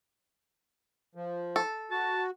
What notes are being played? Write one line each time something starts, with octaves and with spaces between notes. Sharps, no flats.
F3
A4
F#4 A5